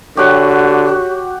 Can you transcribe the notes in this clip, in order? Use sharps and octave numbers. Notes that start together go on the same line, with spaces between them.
D3 F#4 G4 C#5 F#5 C#6